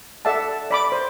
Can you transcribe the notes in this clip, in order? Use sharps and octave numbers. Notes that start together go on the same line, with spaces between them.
A4 D5 E5 F#5 A5
D5 B5 D6
C5